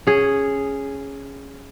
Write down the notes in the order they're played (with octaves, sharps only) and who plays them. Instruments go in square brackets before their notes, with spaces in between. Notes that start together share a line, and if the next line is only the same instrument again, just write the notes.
[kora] C#4 G#4